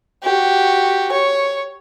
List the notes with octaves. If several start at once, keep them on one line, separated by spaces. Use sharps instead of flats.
F#4 G4
C#5